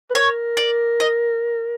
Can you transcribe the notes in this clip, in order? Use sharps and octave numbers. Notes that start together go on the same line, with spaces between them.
B4
A#4 C#5
D5
D#5